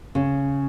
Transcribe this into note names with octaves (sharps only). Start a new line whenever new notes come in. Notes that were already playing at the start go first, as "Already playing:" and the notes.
C#3